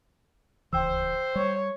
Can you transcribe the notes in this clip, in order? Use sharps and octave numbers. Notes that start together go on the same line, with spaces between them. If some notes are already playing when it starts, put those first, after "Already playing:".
D1 C#2 E3 C5 G5 E6
G3 C#5